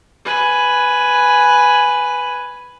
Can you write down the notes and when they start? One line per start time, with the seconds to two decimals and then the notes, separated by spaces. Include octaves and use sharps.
0.25 B4 G#5